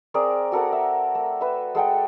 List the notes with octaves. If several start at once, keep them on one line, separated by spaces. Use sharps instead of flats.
C4 G#4 A#4 D5
F#4 A4 A#4 F#5
E5
A3
B4 E5
G#3 A4 F#5 G5